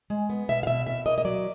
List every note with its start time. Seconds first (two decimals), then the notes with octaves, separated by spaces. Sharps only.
0.10 G#3
0.30 B3
0.49 B2 E5
0.63 F5
0.67 B2 E5
0.87 B2 E5
1.06 A#3 D#5
1.18 D#5
1.25 F#3 D5